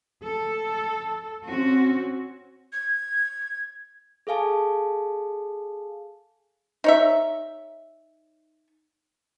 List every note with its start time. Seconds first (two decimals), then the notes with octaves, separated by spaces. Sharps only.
0.24 A4
1.45 C4 C#4 F#4
2.73 G#6
4.27 G#4 A4 F5 G#5 A5
6.84 D#4 C#5 E5